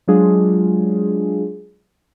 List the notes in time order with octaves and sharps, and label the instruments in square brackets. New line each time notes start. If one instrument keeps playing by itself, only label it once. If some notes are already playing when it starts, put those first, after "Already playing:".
[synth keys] F#3 G#3 D4 F4 G#4